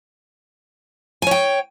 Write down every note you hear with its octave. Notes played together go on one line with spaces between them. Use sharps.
C#5 G5 G#5